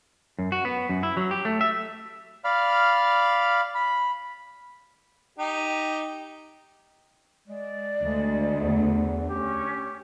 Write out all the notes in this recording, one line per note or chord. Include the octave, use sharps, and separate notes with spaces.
F#2
F#4
B3
F#2
E4
F#3
G4
A3
E5
D5 F5 B5 F6
B5
D#4 G4
G#3 D5
D2 G#3
E2
C#4 G4